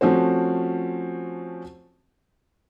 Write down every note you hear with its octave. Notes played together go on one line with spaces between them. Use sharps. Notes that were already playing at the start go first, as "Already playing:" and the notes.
F3 A3 C4 C#4 F#4 C5